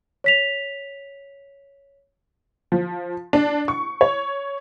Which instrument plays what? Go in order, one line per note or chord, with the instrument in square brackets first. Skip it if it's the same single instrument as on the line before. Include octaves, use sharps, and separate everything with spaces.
[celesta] C#5 B6 F7
[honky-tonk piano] F3
D4
C#6
C#5